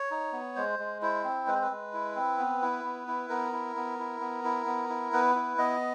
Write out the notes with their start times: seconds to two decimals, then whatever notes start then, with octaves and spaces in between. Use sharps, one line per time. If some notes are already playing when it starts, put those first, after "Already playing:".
Already playing: C#5
0.11 D#4
0.33 B3
0.56 G#3 C5
0.79 G#3
1.02 E4 C5
1.24 C4
1.47 G#3 B4
1.55 C5
1.62 B4
1.70 G#3
1.93 E4
2.15 C4
2.38 B3
2.62 E4
2.84 B3
3.08 E4
3.29 B3 A#4
3.52 E4
3.76 B3
3.99 E4
4.20 B3
4.44 E4
4.66 B3
4.89 E4
5.13 B3 B4
5.35 E4
5.58 B3 D#5